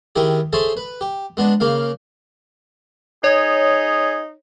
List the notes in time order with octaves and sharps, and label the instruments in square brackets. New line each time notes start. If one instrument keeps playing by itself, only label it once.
[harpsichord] D#3 E4 G4 G#4
G#4 A4 C5 C#5 E5 C6
B4
G4
G#3 B3 D4
C#3 A#3 F5
[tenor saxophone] D#4 [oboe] G#4 [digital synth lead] C#5